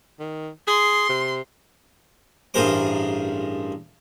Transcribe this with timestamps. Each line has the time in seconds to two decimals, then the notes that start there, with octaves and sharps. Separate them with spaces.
0.19 D#3
0.67 G#4 C6
1.09 C3
2.54 A1 G2 G#4 A#4 C5 D6